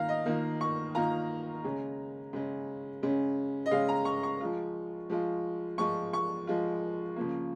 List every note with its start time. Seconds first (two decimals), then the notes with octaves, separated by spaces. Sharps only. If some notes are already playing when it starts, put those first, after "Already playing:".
Already playing: D#3 A#3 F4 F5 A#5
0.09 D#5
0.26 D#3 A#3 F4
0.61 C#6
0.95 D#3 A#3 F4 A#5
1.64 C#3 G#3 C#4
2.33 C#3 G#3 C#4
3.02 C#3 G#3 C#4
3.66 D#5
3.71 C#3 G#3 C#4 F5
3.89 A#5
4.05 C#6
4.23 C#6
4.41 F3 G#3 F4
5.10 F3 G#3 F4
5.78 F3 G#3 F4 C#6
6.13 C#6
6.47 F3 G#3 F4
7.16 C#3 F3 A#3